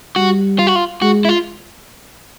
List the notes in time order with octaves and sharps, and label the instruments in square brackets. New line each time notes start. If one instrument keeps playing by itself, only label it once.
[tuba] G3 [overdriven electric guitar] F#4
[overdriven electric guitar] F4
F#4
F4
[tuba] G#3 [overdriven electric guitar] F#4
[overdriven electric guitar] E4
F4